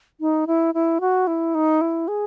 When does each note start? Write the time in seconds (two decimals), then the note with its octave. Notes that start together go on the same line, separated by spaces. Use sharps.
0.21 D#4
0.47 E4
0.74 E4
1.01 F#4
1.27 E4
1.55 D#4
1.81 E4
2.08 G#4